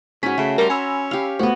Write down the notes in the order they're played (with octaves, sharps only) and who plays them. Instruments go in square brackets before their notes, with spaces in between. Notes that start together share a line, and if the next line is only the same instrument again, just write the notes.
[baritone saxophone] G#2 [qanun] C#4 F#4 [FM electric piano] B6
[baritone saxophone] C#3 [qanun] A3
[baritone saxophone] G3 [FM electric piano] A#4 [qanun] A#5 C6
[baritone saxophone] C#4 [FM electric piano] G#5 B5 E6
[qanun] G4 F5
[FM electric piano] A3 C5 [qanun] B3 F#4